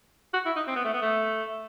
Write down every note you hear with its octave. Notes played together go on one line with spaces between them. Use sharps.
F#4
E4
D#4
C4
B3
A3
B3
A3